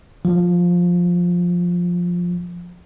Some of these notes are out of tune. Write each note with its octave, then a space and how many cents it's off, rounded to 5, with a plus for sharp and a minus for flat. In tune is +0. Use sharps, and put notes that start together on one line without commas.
F3 +10